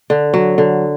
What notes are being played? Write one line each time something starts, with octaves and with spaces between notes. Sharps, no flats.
D3
F#3
D3